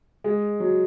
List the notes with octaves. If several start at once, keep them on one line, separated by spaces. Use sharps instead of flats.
G#3
F#3